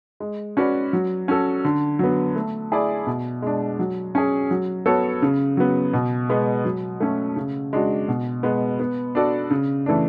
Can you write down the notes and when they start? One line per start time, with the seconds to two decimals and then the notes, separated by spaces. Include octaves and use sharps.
0.20 G#3
0.57 C#4 F#4 B4 D5
0.93 F#3
1.28 C#4 F#4 A4
1.64 D3
1.99 F#3 B3
2.36 A3
2.72 E4 G#4 D5
3.07 B2
3.42 G#3 D4
3.79 F#3
4.15 C#4 G#4
4.51 F#3
4.86 B3 F#4 A4 C#5
5.22 C#3
5.57 F#3 B3
5.93 B2
6.29 G#3 B3
6.65 F#3
7.00 A3 C#4
7.36 C#3
7.73 G#3 D4 F#4
8.08 B2
8.43 G#3 B3
8.80 B3
9.15 D4 F#4 A4 D5
9.50 C#3
9.86 E3 A3 D4